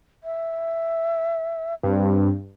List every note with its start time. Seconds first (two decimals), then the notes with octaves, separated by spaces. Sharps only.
0.24 E5
1.83 G2 C4